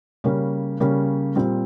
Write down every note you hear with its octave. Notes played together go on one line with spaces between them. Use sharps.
C#3 G3 A#3 C#4
C#3 G3 A#3 C#4
A#2 G3 C4